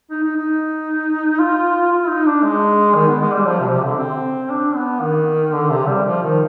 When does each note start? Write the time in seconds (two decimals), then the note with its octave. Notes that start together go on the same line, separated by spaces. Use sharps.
0.10 D#4
0.23 D#4
0.36 D#4
1.39 F4
1.92 F4
2.09 D#4
2.25 D4
2.43 G#3
2.94 D#3
3.08 B3
3.20 G#3
3.34 G3
3.46 F3
3.60 C3
3.66 B2
3.72 C3
3.85 D3
3.98 C4
4.50 D4
4.76 B3
5.01 D#3
5.53 D3
5.70 C3
5.88 G3
6.05 F3
6.22 D#3